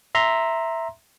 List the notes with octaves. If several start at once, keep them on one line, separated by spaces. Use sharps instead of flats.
E5 A#5 C6